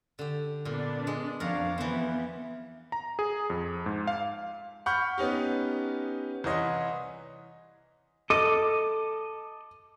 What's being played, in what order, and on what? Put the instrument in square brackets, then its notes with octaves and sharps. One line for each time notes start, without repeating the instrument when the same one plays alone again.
[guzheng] D3 G4
[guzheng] A#2 [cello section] B3 D4
[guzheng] G#3
[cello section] F2 D4 F5 [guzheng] A#4 C#5 F#5
[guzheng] E3 C4 [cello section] B3
[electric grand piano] A#5
G#4
F2
G#2
F5
[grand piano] F#5 B5 C#6 F6 G6
B3 C#4 D#4 G4
C2 E3 C#5 D#5 C6
[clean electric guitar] A4 D#5 [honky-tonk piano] D6